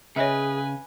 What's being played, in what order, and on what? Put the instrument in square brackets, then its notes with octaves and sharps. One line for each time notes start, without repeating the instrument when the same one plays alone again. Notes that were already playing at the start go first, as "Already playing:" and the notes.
[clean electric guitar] C#3 [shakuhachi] G#4 [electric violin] B4 G#5 [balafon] C#5 D#5 E5